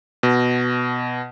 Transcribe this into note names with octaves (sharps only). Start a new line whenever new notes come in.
B2